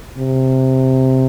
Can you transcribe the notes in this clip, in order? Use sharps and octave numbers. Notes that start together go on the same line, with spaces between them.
C3